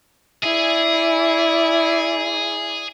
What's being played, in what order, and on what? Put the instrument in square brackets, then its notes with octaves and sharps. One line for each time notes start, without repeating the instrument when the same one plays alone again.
[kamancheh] E4 D5 [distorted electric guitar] G#4